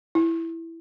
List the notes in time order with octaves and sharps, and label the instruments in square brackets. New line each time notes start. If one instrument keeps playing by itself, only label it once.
[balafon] E4